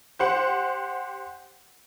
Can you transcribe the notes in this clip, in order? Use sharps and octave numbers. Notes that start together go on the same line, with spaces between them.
G4 C5 F#5